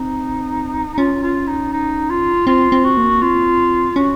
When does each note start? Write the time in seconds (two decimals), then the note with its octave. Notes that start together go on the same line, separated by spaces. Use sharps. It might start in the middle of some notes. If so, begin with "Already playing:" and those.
Already playing: C4 D#4
0.93 D#4
0.98 C#4 F4
1.23 F4
1.48 D#4
1.73 D#4
2.10 F4
2.47 C4 F4
2.72 C4
2.84 F#4
2.97 A#3
3.22 C4 F4
3.96 C#4 F#4